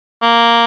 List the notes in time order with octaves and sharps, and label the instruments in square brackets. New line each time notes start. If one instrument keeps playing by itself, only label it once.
[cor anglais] A#3